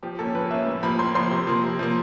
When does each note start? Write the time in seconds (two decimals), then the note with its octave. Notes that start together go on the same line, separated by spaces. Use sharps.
0.03 F3 G4
0.19 A#3 C#4 A4
0.35 F3 B4
0.51 A#3 C#4 E5
0.66 A2
0.83 F3 A#3 B5
0.99 A2 C6
1.15 F3 A#3 C6
1.31 C3
1.47 F3 A#3
1.63 C3
1.79 F3 A#3